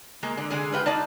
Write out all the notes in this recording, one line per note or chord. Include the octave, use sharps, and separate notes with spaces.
G#3 A#3
D3
D3 G#3 G#4
F4 B4 F#5 G5
D#4 D5 A5